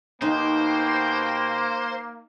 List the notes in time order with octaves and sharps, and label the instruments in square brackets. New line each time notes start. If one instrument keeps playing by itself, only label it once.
[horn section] B2 G4 G5 [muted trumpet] A#3 [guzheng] D#4 [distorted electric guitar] C5